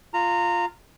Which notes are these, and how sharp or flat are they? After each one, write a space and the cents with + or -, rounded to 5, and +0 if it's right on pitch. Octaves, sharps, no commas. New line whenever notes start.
F4 +0 A#5 -20